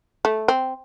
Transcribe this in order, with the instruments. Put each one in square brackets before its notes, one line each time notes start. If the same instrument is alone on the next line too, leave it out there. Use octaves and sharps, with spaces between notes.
[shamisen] A3
C4